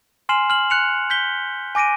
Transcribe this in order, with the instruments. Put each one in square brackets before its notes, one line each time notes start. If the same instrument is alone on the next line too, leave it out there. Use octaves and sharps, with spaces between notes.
[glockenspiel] G#5 C6 F6 C7 E7 F#7
F6 F#7
F#6 C#7 F7
G6 B6 G7
G#5 D6 A#6 D7 D#7